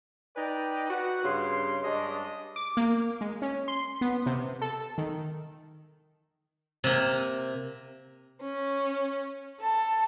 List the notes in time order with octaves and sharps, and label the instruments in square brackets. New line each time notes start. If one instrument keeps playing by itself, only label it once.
[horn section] D#4 B4 D5 G5
F#4 B4 F#5
G2 C#3 C6
G2 G#3 C#4 D4 D#5
[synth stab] D6
A#3
G#3
C#4
C6
B3
C3
A4
D#3
[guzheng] C3 A#3
[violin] C#4
A4 A5